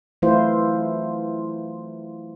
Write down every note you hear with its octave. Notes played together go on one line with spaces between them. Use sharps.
E3 F#3 A3 E4 F4 C5